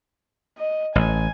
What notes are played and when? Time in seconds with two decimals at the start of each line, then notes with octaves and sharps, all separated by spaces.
0.58 D#5
0.95 A1 G#5